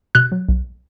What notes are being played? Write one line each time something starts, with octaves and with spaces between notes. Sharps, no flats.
B2 F#6
F#3
B1